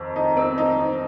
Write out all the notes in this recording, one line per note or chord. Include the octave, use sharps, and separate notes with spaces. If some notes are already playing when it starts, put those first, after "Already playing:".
Already playing: F2 D#3
D#4
C4
D#4